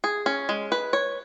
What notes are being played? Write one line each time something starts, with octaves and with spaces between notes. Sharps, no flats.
G#4
C#4
G#3
B4
C#5